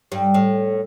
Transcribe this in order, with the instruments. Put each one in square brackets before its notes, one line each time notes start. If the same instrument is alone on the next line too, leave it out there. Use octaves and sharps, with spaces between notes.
[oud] G2
A2